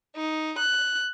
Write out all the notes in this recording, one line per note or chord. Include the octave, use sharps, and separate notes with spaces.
D#4
F#6